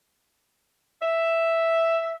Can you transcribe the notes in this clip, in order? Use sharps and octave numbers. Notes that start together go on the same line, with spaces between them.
E5